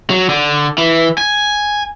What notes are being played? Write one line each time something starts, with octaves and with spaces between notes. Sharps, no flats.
F#3
D3
E3
G#5